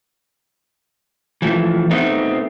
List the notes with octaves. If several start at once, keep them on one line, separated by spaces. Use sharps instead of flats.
E3 F3 A3
A3 B3 C4 D#4